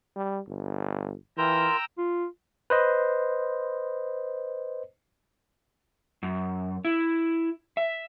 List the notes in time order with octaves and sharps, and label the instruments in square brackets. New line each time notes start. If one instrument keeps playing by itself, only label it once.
[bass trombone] G3
G1
[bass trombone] E3 [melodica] F4 A#4 [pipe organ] G5 A#5 E6
[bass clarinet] F4
[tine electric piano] B4 C5 D#5
[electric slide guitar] F#2
E4
E5